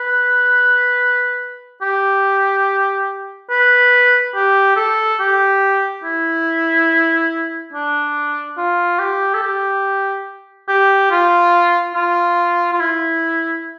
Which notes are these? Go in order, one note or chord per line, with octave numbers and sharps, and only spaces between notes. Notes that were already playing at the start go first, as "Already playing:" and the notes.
Already playing: B4
G4
B4
G4
A4
G4
E4
D4
F4
G4
A4
G4
G4
F4
F4
F4
E4